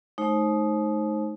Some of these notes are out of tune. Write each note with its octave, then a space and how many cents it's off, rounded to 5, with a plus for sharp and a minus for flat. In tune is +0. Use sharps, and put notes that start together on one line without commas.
A3 -45 D#4 +0 C5 +30